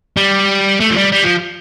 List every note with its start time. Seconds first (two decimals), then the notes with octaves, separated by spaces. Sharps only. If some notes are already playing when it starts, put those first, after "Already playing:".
0.17 G3
0.80 A3
0.91 F3
0.96 G3
1.12 G3
1.24 F3